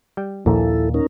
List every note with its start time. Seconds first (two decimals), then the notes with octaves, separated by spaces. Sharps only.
0.17 G3 G5
0.46 A#1 D#2 A#2 A#3 E4 A4
0.94 C#4 D#4 A#4